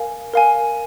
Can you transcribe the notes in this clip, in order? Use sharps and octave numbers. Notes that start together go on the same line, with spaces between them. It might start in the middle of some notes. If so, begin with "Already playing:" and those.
Already playing: A#4 F5 G#5
A#4 F5 G#5